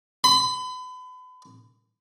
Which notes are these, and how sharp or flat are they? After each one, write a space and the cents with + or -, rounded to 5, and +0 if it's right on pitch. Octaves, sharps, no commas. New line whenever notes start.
B5 +35